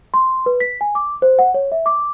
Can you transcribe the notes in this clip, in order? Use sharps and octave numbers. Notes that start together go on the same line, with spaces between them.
C6
B4
B6
G#5
D6
C5
F#5
C#5
E5
D6